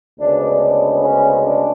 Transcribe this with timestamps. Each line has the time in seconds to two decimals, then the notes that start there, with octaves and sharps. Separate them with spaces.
0.19 D2 C#3 G#3 B3 D4
0.61 D4
1.02 C#4
1.42 D4